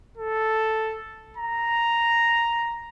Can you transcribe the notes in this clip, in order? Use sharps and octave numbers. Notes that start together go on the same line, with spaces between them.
A4
A#5